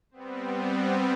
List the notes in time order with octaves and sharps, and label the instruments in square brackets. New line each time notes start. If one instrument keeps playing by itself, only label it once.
[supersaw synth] G3 B3 C4